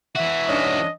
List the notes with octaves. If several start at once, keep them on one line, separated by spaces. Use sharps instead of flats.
E3 F#4 E5
G2 C#4 D4 D#5